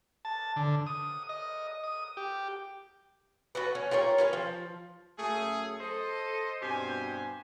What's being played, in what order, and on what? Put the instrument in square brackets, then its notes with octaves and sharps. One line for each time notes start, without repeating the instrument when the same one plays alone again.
[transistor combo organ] A5
D3
D#6
D#5
D#6
G4
[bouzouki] F#4 A4 B4
C#4
F4 G4 A#4 C#5
C#4 B4 F5
F3
[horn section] F#2 A3 G#4
A4 C5 D#5
G2 B2 C4 G4 C5 G#5